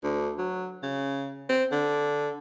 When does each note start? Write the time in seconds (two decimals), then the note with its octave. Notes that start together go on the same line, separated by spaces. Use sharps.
0.04 D2
0.38 F#3
0.83 C#3
1.49 C4
1.72 D3